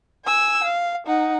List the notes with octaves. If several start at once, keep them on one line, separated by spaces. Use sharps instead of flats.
G#5 E6
F5
D#4 F#5